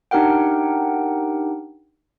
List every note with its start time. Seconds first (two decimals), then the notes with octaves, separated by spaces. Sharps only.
0.11 D4 D#4 G4 A#4 F#5 G5